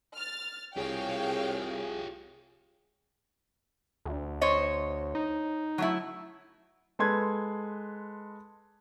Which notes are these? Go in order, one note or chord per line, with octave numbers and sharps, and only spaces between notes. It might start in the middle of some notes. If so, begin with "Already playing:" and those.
F6 A6
C2 F4 G4 G#4 C#5 F5 G5
D2
C5 C#5 D#5
D#4
F#3 A3 E4
G#3 A4 B4 C6 G#6